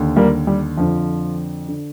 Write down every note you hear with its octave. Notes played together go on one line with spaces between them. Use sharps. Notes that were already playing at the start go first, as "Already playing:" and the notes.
Already playing: D#2 D3
G3 A#3
G3
F2 D3 F3
D3